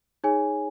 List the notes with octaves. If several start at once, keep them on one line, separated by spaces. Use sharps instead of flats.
D#4 G#4 C#5 G#5